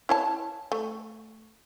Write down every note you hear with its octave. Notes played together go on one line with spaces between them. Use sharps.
E4 C#5 A5
A3